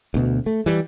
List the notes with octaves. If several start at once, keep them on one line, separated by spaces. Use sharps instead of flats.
D2 B2
A3
E3 G3